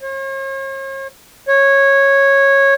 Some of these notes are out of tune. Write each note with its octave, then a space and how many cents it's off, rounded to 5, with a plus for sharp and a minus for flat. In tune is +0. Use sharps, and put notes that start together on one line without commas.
C#5 -45
C#5 -10